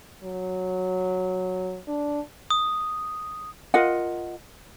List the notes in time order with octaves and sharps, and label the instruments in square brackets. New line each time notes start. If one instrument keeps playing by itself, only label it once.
[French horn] F#3
D4
[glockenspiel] D#6
[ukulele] F4 A#4 D#5 F#5